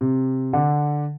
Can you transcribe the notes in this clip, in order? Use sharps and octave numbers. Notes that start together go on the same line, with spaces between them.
C3
D3